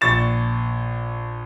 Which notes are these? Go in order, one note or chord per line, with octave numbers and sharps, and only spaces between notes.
A#1 C#6 A6 E7